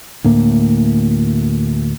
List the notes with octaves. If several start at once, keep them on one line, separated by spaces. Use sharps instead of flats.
D2 A2 A#3